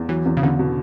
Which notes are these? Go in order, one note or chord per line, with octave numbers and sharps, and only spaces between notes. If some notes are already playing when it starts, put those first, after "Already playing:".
Already playing: E2
E3 F#3
E2
C#3
E2 D3
B2